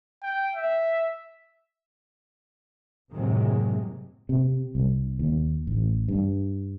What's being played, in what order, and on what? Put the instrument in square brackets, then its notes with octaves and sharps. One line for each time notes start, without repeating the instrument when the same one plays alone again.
[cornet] G5
E5
[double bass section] F#1 A2 C3 D#3 F#3 G#3
[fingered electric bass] C3
C2
D#2
A1
G2